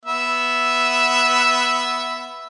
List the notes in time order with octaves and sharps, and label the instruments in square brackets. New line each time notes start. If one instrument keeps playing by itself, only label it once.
[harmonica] B3 E5